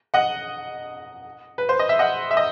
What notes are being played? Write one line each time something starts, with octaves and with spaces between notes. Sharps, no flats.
D#5 F#5
B4
C5
D#5
E5
D#5 F#5
E5
D#5